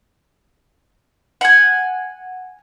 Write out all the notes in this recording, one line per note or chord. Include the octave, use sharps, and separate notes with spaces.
F#5 G#5